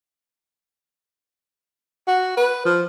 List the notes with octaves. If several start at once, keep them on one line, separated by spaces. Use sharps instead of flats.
F#4
B4
F3